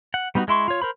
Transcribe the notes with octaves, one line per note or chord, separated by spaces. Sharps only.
F#5
G3 B3 D#4 F4 F#4
G#3 E4 C6 C#6
F4 C#5
A#4 C5 B5